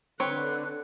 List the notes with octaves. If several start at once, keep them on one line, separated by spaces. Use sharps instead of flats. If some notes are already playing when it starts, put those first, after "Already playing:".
D3 C4 B4 C#5 F#6